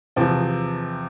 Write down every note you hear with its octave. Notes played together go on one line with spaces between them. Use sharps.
E2 C3 F3 C4